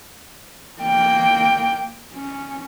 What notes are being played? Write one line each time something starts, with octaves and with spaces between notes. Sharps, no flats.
A#3 G5
C#4